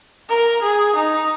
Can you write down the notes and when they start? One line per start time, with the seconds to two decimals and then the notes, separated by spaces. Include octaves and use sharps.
0.29 A#4
0.62 G#4
0.96 D#4